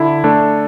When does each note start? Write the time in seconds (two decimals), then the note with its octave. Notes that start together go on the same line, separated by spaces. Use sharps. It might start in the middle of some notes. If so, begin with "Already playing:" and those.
Already playing: D3 E4
0.24 A3 D4 A4